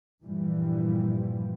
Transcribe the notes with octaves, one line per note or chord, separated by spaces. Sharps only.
G2 A#2 E3 F3 G3